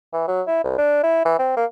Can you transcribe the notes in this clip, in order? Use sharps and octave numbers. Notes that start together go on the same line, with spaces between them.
E3
F#3
E4
C2
D4
E4
E3
C4
A#3